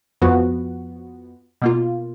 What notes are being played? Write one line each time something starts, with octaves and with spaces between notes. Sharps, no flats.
F2 F3 B3 F#4
B2 A#3 F4